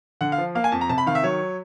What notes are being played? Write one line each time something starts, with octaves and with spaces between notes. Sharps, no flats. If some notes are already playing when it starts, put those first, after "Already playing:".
D3 F#5
F5
F3
A#3 F5
G#5
F2 A5
A#5
C3 A5
B5
D#3 F5
E5
F#3 C#5